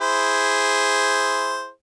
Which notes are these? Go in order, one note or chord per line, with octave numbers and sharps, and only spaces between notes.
E4 G#4 C5